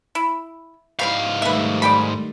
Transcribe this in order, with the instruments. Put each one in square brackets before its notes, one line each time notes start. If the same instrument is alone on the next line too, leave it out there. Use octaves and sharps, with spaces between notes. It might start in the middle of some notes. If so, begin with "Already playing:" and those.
[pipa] E4
[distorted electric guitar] G#2 F5 [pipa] G3 C4 E4
[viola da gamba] D#3 G3 A3 [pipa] B4 E5
[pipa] D5 G5 B5